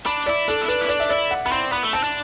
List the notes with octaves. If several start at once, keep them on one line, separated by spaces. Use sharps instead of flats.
D4 B5
E4 D5
D4 A4
E4
D4 B4
E4
D4 D5
E5
E4 D5
F#5
B3 B5
C4 C6
B3 B5
A3
C4 A5
D4